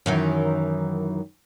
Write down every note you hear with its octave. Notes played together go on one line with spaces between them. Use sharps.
F#2 D#3 E3